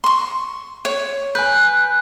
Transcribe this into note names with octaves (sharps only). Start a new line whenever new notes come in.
C6 C#6
C#5
B4 G#5 F#6 G6